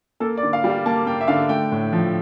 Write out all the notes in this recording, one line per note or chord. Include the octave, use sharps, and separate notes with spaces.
A#3 A4
D5
D3
F5
G3
F5
A#3 A5
A#3 G5
E5
D3 F5
A3 G5
A2
F3